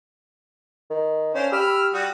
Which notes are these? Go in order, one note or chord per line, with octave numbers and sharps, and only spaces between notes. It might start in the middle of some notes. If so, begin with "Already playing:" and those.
D#3
C#4 D4 C5 F5
G4 B5 E6 F6
G3 F#4 D#6